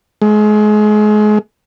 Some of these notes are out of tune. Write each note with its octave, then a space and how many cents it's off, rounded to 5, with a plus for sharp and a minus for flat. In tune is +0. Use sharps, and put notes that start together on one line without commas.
G#3 +30